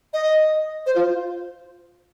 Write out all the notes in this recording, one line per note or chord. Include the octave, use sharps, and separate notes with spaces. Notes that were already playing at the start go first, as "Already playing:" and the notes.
D#5
C5
F4